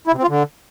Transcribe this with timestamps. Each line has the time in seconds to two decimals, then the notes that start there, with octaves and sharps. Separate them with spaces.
0.07 E4
0.13 C3
0.18 C4
0.23 F4
0.29 D3